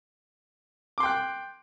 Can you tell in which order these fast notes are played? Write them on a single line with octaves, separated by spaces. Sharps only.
D6 C6 G5 F#6